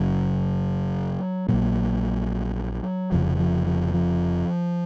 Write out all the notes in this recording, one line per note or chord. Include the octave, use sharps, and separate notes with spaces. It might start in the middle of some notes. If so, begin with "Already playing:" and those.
Already playing: F#1 F#2 C#3 F#3
A#1 A#2 F#3
F1 F2 C#3 F3
F3
F3
F3